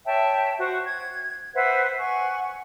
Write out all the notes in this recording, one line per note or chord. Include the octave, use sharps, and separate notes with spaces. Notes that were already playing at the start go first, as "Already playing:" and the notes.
C#5 E5 G5 A5
F#4 C5 F#5 C#6
G#6
B4 C5 E5 F#5
F#5 G#5 C#6